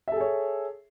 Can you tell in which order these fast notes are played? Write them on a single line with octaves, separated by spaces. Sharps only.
E5 A4 G#4 C#5